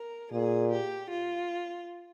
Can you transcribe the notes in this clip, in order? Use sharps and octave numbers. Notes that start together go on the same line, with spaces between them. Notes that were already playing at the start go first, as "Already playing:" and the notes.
Already playing: A#4
A#2 G#4
G4
F4